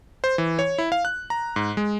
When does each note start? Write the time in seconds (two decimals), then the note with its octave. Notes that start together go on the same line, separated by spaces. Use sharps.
0.24 C5
0.38 E3
0.59 C#5
0.78 E4
0.92 F5
1.05 F#6
1.30 A#5
1.56 G#2
1.77 G#3